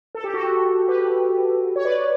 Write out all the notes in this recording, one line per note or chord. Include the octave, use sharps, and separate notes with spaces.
A4
G4
F#4 A4
G4 B4
C#5
B4 D5